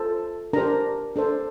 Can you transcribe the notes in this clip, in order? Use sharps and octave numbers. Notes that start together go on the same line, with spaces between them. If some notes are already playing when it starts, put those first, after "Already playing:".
Already playing: F4 A4 C5
D4 G4 A#4 C5 A#5
D4 A4 C5